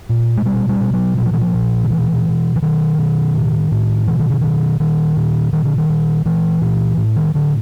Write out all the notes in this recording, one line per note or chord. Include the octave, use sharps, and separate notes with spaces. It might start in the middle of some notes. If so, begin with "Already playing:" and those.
A#2
G#3
B2 G3
G3
B2
F#3
A#2 F#3
F3
E3
F3
A#2
D#3
B2 E3
B2
E3
B2 D#3
B2
A2
A2
B2 E3
D#3
D3
B2 D#3
A#2 D#3
A#2
A#2 D#3
D3
D#3
A#2
A#2 E3
A#2
A2
D#3
A2 D3